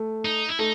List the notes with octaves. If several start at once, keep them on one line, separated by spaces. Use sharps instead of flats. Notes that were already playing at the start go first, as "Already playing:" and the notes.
Already playing: A3
D#4
E4
A3 D#4